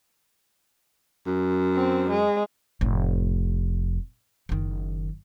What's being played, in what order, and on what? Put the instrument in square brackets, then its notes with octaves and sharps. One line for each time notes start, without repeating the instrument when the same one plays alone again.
[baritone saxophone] F#2
[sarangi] C4
G#3
[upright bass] F1 A2
F#1 D#3